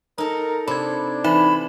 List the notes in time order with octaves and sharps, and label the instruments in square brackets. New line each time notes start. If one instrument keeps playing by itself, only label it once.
[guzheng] D#4 A4 [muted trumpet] A#4
[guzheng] C3 [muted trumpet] D4 [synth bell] B5 G#6
[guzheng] E3 [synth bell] D#4 E5 E7 [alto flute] B5